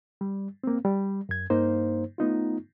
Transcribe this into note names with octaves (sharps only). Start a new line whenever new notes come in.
G3
A#3 C4
G3
F#2 G#6
G2 A#3 D#4 C5
A3 B3 D#4 F4